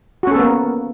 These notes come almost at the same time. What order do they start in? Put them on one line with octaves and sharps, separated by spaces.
F#4 C#4 A4 B3 A#3